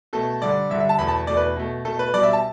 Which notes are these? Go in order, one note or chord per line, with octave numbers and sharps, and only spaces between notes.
B2 A3 A4
G2 D3 G3 D5
G2 D3 G3 E5
E5
A5
E2 B2 A3 B5
A5
E2 B2 A3 D5
B4
B2 A3
B2 A3 A4
B4
B2 G3 D5
E5
A5